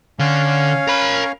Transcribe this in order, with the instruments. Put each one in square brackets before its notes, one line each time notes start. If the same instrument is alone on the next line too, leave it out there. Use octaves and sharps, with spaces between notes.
[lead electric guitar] D3 [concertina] C#4 C#5 F5
[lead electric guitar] A#4 B5